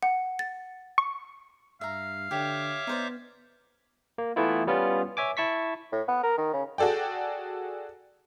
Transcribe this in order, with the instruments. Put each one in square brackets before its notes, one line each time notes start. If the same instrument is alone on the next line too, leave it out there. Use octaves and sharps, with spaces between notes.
[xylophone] F#5
A6
[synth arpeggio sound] C#6
[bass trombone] G2 [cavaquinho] E5 A#5 [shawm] F5
[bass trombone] D3 [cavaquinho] G4 [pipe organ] C#5 E5 D6
[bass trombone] B3 [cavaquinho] D#4 C5 D5
[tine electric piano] A#3
E3 A3 B3 E4 F4
G3 B3 C#4 F4
C#5 E5 G#5 D6
E4 A5 C#6 B6
[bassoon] A2
B3
A#4
D#3
C#3
[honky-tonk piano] F#4 G#4 A4 D5 G5